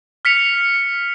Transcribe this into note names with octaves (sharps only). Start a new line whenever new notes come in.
F6 B6 C#7 F7